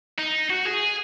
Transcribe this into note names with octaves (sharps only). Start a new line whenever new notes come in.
D#4
F#4
G#4